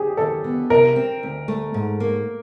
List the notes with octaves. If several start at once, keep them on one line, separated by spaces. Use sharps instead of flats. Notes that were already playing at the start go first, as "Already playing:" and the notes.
Already playing: C4 G4 G#4
D#2 A4
B3
C3 A#4
C4
D2
A3
G#2
A#3